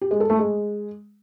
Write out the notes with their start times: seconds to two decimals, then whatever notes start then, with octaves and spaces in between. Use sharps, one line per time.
0.01 G4
0.11 G#3
0.20 A4
0.30 A3
0.39 G#3